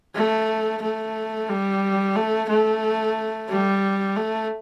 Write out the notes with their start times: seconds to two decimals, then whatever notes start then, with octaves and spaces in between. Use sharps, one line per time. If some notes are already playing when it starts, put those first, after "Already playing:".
0.15 A3
0.82 A3
1.49 G3
2.16 A3
2.49 A3
3.49 G3
4.16 A3